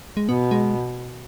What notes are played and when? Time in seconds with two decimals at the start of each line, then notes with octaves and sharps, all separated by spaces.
0.17 G#3
0.29 B2 B3
0.51 G#3